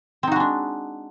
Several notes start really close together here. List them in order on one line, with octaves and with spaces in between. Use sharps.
C4 D#4 F#4 G#3 D4